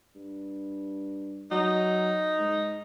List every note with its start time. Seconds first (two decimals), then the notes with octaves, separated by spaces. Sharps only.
0.15 G2
1.51 F#3 D#4
2.38 G#2